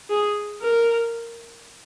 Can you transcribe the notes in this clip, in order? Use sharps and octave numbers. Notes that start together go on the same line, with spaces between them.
G#4
A#4